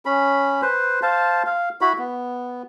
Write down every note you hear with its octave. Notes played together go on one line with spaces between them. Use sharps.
C#4 B5
B4 C5
C5 F5 A5
F5
E4 F#4 B5
B3